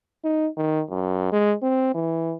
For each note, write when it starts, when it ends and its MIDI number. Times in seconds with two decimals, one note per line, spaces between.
0.24 0.48 63
0.57 0.82 51
0.90 1.30 42
1.32 1.55 56
1.62 1.94 60
1.94 2.35 52